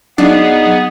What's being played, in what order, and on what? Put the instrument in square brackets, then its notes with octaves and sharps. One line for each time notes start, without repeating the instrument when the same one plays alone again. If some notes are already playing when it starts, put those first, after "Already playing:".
[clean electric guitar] F#3 D5 F5 [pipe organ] B3 G#4 [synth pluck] D4 [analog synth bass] D#4